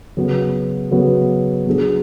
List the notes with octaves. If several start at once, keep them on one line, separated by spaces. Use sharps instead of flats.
C#3 F#3 B3 F#4
C#3 F#3 B3 F#4
F#3 B3 D4 G#4